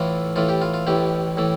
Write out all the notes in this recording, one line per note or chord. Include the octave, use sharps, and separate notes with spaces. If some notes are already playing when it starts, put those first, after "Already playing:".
Already playing: A2 E3 A3 F4
A2 E3 A3 F4
G4
F4
F4
A1 A2 E3 A3 G4
A2 E3 A3